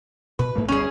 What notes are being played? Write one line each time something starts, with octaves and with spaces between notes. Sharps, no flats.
B2 B4
G#2 A3 A#3
G1 D2 G3 C#4 G#4